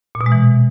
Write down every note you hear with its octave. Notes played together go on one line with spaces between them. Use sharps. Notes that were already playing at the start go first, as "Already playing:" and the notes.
A#2
B2
G#3
E3